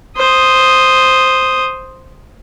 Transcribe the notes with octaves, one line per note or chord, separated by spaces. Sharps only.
C5 D#6